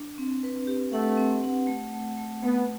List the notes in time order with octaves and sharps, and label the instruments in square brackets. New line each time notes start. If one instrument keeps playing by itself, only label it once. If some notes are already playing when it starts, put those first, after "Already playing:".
Already playing: [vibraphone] D4
C4
B4
G4
[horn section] A3 [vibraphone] F#5
[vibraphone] C4
F#5
A3
A3
A3
[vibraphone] A3 [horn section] B3